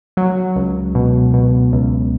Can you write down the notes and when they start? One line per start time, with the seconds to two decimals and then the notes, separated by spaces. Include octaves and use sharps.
0.17 F#3
0.56 C#2
0.95 B2
1.34 B2
1.73 C#2